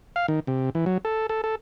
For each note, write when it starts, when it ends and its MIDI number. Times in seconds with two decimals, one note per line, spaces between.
0.16 0.26 77
0.28 0.40 51
0.47 0.70 48
0.75 0.85 52
0.86 0.98 54
1.05 1.27 69
1.29 1.41 69
1.44 1.55 69